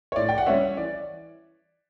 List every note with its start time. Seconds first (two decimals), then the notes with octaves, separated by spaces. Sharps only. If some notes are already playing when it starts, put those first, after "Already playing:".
0.12 C#5
0.16 A2 D5
0.29 G5
0.38 F#5
0.46 G3 C#4 C#5 E5
0.77 E3 D5